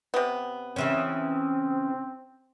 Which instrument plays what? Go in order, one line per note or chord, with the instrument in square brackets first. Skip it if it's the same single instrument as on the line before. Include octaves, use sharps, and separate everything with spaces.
[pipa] C3 B3
[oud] C#3 E3 C#4 [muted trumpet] C4